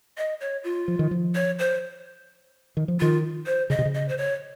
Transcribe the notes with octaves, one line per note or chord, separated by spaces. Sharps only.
D#5
C#5
F4
F3
D#3
F3
C#5
C5
D#3
F3
D#3 F4
C5
C#3 D#5
C3
C#3
D#5
C5
C#5